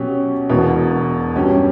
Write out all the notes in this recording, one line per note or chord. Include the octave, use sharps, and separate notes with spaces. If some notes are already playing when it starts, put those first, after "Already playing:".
Already playing: B2 F#3 C#4 G4
E1 E2 B2
G2 F#3 C#4 G4 C#5